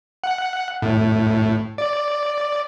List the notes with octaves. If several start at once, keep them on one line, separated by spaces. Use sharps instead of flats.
F#5
A2
D5